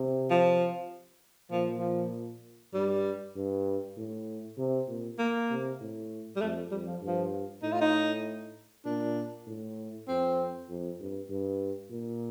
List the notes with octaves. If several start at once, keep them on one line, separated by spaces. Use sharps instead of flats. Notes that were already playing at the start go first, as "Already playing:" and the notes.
Already playing: C3
F3
A#2 F3
F3
G2 G3
G2
A2
C3
A#2
A#3
C3
A2
G3
F2 A3
F2 G3
F3
G2
F3
A2 D#4
F4
D#4
A#2 D4
A2
F2 C4
F2
G2
G2
A#2